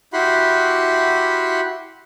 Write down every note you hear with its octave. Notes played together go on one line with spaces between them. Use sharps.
E4 F#4 G4 F#5 B5 C6